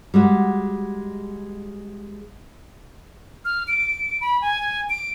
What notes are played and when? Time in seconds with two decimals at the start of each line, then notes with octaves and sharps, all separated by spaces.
0.14 G3 G#3 F#4
3.45 F6
3.68 D7
4.21 B5
4.41 G#5
4.90 D7